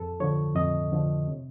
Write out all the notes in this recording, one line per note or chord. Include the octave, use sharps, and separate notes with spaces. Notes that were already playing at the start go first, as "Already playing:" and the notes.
Already playing: F2 A4
D3 F3 C#5
F2 D#5
D3 F3
C3